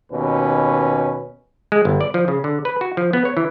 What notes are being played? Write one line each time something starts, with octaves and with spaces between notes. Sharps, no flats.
D#2 B2 C#4 B4
G#3
G1
D5
F3
C#3
D3
B4
F#4
F3
B3
C#5
E3